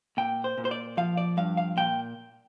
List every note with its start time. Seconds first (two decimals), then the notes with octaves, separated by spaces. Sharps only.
0.17 A#2 G5
0.44 C5
0.58 A#2
0.65 C5
0.71 D5
0.97 F3 F5
1.17 D5
1.37 G2 F5
1.57 F5
1.77 A#2 G5